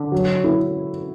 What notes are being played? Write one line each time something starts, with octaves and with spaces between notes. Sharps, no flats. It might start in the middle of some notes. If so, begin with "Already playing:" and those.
Already playing: D3
F#3
E4